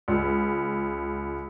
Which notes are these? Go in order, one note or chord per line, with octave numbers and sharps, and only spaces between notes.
C#2